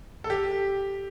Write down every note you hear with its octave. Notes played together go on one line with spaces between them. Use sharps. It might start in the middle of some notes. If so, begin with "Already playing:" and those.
A4
G4